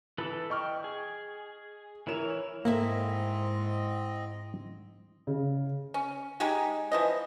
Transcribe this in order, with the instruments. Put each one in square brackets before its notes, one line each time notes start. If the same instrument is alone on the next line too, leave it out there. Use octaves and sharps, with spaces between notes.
[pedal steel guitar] E3 A4 B4
[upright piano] D#5 C#6 F6 [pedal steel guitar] G5
[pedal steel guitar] G#4
[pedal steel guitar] E3 C#5 [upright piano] E4 A#4 E7
[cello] G#2 [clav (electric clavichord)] A#3 [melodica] C4 D#5 [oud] E4 A4 E5
[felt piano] C#3
[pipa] C#4
G#3 D#4 G4 G#4
E3 F3 D#5